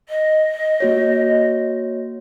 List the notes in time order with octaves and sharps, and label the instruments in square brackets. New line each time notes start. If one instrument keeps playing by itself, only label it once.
[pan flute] D#5
[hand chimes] A#3 F#4 C#5